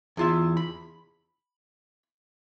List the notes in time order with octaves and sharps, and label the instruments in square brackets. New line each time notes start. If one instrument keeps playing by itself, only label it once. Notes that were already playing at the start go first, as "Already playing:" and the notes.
[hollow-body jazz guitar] E2 F4 E5
B5